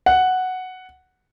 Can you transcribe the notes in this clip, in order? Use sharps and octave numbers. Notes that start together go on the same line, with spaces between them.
F#5